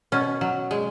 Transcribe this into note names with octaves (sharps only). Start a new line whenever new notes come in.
B2 C#4
F#3
G#3